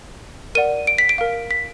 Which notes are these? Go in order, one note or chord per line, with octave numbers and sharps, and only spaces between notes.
A#4 D5 F#5 D#7
D7
B6
D7
A#4 F5
B6